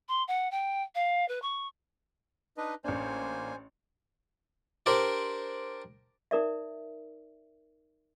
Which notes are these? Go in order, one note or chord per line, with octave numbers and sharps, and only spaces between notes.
C6
F#5
G5
F5
B4
C#6
D4 D#4 B4 D#5
A1 A#3 D4 C5 G#5
D4 G4 A#4 C5 D5
D#4 A#4 D5 E5